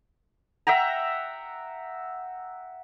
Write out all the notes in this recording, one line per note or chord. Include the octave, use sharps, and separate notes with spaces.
E5 F#5 G5 A#5